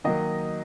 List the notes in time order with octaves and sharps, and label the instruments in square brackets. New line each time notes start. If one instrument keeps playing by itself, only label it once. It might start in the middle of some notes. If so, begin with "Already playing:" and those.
[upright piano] D#3 F#3 A#3 D#5